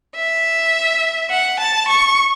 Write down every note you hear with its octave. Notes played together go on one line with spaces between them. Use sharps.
E5
F#5
A5
C#6